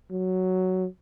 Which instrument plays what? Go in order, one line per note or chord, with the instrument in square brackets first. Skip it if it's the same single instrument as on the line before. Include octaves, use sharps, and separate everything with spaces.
[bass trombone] F#3